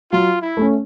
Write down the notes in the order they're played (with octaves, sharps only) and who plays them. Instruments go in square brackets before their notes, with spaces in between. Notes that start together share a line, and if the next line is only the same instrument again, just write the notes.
[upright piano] F#3 [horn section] F4
[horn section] E4
[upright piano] A3 C#4